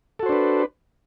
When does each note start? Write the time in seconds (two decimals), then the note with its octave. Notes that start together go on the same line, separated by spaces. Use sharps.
0.19 A4
0.23 F#4
0.26 C5
0.29 D4
0.32 B4